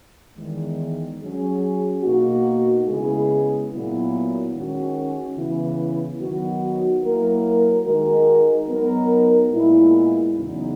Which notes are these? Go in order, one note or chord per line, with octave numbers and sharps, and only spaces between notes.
E2 D#3 G#3
F#3 C#4 G#4
B2 A#3 D#4 F#4
C#3 G#3 B3 E4 G#4
A#2 F#3 B3 E4
D#3 G#3 C#4 F#4
C#3 E3 B3 E4
D#3 F#3 B3 D#4 F#4
F#3 A#3 E4 A#4
D#3 G#3 D#4 F#4 A#4
F#3 B3 D#4 A#4
A#2 G#3 B3 E4
E2 C#3 F#3 B3 D#4